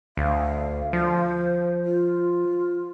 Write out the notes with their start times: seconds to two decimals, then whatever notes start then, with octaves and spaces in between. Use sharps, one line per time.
0.17 D2 F5
0.93 F3 C5
1.85 F4